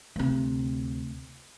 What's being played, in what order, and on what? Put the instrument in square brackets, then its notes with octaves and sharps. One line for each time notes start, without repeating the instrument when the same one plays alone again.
[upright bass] D2 C3